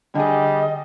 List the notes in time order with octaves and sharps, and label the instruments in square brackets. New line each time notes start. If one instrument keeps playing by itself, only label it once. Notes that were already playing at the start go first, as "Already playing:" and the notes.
[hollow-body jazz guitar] D3 G#4 [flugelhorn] G3 [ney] D#5